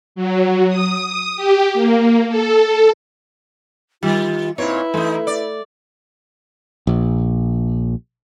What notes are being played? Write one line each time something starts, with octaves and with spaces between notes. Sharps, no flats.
F#3
D#6
G4
A#3
A4
D#3 G3 F4
A#2 C4 D#4 E4 B4 C#5
E3 A3 D#4
D5
A#1